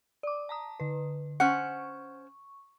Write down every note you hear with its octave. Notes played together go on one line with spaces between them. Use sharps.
D5 D6
A5 A#5 D#6
D3 B4
C#4 C5 F#5 C#6